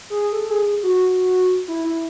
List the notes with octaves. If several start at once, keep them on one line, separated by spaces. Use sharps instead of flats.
G#4
A4
G#4
F#4
E4
E4